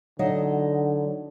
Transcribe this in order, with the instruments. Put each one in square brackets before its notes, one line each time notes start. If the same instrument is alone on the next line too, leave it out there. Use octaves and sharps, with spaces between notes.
[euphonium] D3 [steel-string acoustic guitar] F#3 D#4 D#5